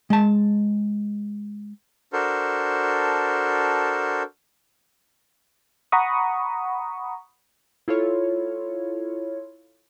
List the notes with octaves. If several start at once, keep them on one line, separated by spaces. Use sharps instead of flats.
G#3 A5
D4 F#4 A4 A#4 C5
F#5 A#5 B5 C#6 D#6
E4 F4 A4 C#5